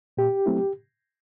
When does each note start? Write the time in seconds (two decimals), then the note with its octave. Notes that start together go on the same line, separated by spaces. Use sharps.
0.17 A#2 G4
0.46 F#3 A3 C4 E4